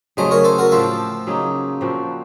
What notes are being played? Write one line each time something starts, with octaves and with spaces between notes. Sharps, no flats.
C#3 F#3 A3 C#4 C5 D#5
A#4 C#5
A4 C5
F#4 A#4
A2 F3 C4 F4 A4
C#3 F#3 A#3 D#4
A#2 F3 C4 F#4